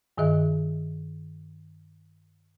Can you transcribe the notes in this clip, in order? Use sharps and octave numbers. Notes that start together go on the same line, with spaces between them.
G2 D#3 G#4 D#5 E5